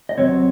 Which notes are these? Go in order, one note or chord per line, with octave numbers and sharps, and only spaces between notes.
D#5
C2 C3 F#3 C4 C#5